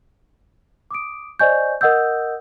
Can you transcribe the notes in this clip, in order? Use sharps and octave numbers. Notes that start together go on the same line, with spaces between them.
D6 D#6 D7
C5 D5 D#5 G#5 C#6 G6
A#4 D#5 F#5 D#6 E6 G6